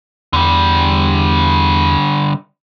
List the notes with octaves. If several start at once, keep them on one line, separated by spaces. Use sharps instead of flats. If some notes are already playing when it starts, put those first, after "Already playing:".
E2 D3 G3